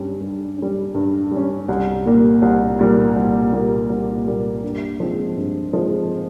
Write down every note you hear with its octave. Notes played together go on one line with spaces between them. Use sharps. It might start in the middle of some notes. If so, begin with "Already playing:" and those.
Already playing: G2 G3 C#4
G2
G3 C#4
G2
G3
C#4
C2
A#2 G3 A#3
C2
A#2 G3 A#3
C2
A#2 G3 A#3
C2
A#2 G3 A#3
G2
F3 G#3 C4
G2
F3 G#3 C4